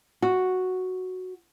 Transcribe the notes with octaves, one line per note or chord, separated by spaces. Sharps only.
F#4